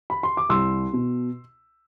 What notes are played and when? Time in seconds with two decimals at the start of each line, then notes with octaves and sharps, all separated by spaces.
0.10 B5
0.23 C6
0.37 D6
0.49 C2 C6 E6
0.93 B2